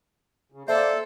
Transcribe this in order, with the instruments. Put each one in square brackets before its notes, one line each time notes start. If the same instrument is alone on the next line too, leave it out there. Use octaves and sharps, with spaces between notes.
[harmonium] C#3
[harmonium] A#3 D5 [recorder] A4 [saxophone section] C5 [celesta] E5